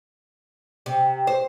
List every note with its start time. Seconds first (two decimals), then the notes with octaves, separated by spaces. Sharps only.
0.86 C3
1.27 C5